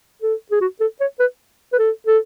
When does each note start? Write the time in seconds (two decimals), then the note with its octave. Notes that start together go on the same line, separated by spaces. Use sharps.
0.22 A4
0.51 G#4
0.61 F#4
0.80 A4
1.00 C#5
1.20 B4
1.73 B4
1.78 A4
2.07 A4